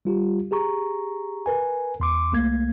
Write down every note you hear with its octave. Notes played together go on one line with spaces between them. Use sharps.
G3 F4 G4
G4 G#4 A#5 C#6
A#4 B4 G#5
E2 C6 D6
C2 A3 A#3 G#6